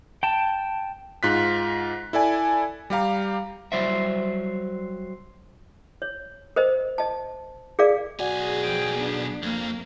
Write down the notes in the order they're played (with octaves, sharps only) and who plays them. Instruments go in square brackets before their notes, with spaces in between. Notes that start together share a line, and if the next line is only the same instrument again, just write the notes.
[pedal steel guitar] G5 A5
[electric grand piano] G#2 F4 F#6 B6
E4 A4 D5 G#5
G3 G4 F5 A#5
[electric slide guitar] F#3 G3 C5 D5 E5
[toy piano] C#5
A#4 C5 D#5
D#5 A5
G#4 A#4 D5 F5
[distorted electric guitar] B1 G#5 [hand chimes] F#4 D5 F#5 [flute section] G#4
[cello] F3 G5
B3 D4
[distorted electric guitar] F2 [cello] A#3